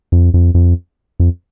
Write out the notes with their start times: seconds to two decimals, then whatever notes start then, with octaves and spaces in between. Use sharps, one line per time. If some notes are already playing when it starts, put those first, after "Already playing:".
0.12 F2
0.34 F2
0.54 F2
1.20 F2